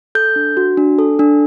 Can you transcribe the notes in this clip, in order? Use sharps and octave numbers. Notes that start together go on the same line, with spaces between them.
A4 G6
D4
F#4
D4
A4
D4